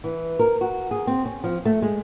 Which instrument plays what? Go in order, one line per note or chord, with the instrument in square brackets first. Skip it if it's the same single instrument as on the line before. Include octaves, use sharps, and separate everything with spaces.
[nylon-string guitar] E3
A#4
F#4
G#4
C4
C#4
F3
A3
G#3